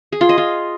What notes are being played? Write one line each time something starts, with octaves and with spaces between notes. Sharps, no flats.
G#4
F4
D#5
F4